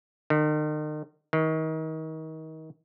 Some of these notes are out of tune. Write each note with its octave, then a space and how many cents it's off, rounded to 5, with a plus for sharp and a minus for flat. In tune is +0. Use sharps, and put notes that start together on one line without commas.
D#3 -40
D#3 +30